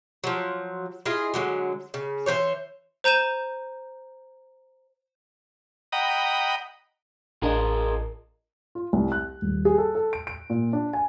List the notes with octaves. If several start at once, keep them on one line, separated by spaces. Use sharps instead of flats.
F3 F#3
E4 F4 G#4 D#5
D3 F#3 G#3
C#3
E3 F#3 C5 C#5
C5 A#5 G6 D#7 E7
D#5 F#5 G5 A#5 B5 D#6
A1 D4 F4 G#4 A#4 D#5
F4
C2
F#6
D#1
G#4
A4
A4
D7
D7
A#2
D4
G#5